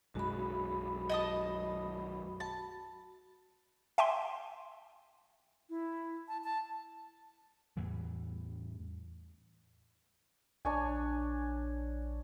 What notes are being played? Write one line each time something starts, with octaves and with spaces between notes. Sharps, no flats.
B1 F#2 G#3 F#4 B5
D#5 A5 D#6
A5
E5 G5 G#5 C6
E4
A5
A5
E2 A2 E3 G3
A#1 D4 C#5 G#5